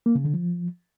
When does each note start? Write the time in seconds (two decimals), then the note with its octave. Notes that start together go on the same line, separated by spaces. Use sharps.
0.06 A#3
0.15 C#3
0.24 D3
0.34 F3